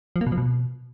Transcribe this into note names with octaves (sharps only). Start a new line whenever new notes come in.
F3
A#3
B2
F3
B2